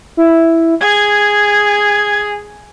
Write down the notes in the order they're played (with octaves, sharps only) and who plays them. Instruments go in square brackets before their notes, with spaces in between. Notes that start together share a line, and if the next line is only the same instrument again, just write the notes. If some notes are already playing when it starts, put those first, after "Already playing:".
[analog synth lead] E4
[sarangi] G#4 [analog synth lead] G#6